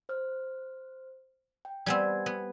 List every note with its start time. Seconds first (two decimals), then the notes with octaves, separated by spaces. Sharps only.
0.09 C5 F6
1.65 G5
1.86 G3 B3 C4 F#5 G#5 G#6
2.26 B3